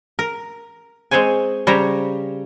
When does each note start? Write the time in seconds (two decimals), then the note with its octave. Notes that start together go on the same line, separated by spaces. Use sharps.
0.19 A#4
1.11 G#3 C4 C5 C#5 G#5
1.67 C#3 G3 C5 C#5 A#5